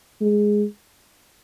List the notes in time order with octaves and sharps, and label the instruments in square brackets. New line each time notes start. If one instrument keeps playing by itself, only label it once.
[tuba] G#3